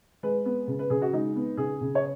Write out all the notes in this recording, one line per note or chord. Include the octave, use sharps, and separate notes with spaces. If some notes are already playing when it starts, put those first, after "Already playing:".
G#3 B4
B3
C#3
B4
C#3 G#4
F#4
G#3 D#4
B3
C#3 G#4
C#3
C#5